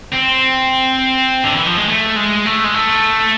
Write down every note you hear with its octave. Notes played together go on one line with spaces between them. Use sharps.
C4
D3
E3
F3
G#3
A3
G#3
A3
G#3
A3